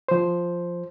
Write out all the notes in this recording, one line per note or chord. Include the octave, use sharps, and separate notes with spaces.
F3 C5